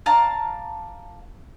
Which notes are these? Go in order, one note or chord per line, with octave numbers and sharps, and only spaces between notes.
D5 F5 A5 A#5